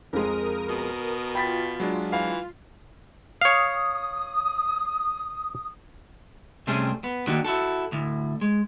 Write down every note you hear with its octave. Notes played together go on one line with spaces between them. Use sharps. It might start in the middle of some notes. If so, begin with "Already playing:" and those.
F2 F3 G#3 A#4 D#6
B2
F4 G5 B5 A6 B6
F#3 G#3 D4
E3 F5
C#5 F5 D#6
C3 G3 A3 C4 C#4 G#4
B3
D#3 A#3 D4 F#4 G4
E4 F#4 A4
D2 A2
G#3